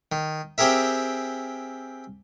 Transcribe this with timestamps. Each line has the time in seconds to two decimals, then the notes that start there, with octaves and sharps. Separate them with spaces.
0.12 D#3
0.58 C4 G4 G#4 A#4 E5